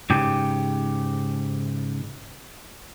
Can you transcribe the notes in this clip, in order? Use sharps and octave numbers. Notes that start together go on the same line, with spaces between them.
G#2 C#3 G4